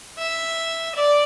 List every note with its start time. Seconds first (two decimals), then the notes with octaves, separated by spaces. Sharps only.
0.18 E5
0.95 D5